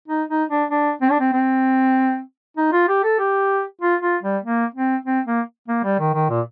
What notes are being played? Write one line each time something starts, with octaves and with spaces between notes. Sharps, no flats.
D#4
D#4
D4
D4
C4
D4
C4
C4
D#4
F4
G4
A4
G4
F4
F4
G3
A#3
C4
C4
A#3
A#3
G3
D#3
D#3
A#2